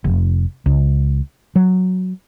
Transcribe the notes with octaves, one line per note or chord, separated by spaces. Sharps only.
F1
C#2
F#3